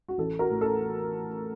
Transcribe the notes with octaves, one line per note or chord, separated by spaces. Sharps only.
F#4
A1 A4
F#4 A#4
A2
A4